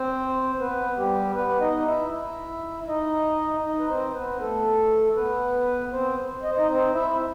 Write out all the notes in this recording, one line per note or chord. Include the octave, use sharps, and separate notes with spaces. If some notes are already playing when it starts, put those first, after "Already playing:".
Already playing: C4 C5
B3 B4
G3 G4
B3 B4
D#4 D#5
E4 E5
E4 E5
E5
D#4 D#5
D#4 D#5
B4
C4 C5
B3 B4
A3 A4
B3 B4
C4 C5
D#5
C5
D#4 D#5
C4 C5
E4 E5